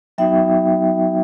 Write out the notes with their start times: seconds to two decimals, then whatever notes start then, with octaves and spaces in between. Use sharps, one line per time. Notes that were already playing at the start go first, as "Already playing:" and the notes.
0.18 F#3 B3 D#4 F#4 E5 G5